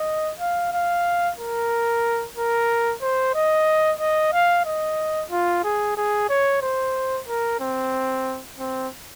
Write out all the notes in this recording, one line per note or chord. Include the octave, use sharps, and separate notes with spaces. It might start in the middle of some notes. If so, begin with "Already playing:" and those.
Already playing: D#5
F5
F5
A#4
A#4
C5
D#5
D#5
F5
D#5
F4
G#4
G#4
C#5
C5
A#4
C4
C4